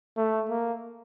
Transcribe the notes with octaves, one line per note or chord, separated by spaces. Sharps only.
A3
A#3